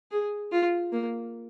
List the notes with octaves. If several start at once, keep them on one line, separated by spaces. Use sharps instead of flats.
G#4
F4
A#3